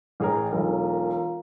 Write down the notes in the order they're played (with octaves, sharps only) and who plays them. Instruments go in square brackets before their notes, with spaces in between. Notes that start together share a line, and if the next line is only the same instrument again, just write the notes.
[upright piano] A1 G#4 A#4
[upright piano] E1 B1 [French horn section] F4 A#4